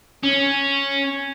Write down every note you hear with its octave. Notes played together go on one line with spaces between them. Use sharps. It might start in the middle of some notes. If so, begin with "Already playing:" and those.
C#4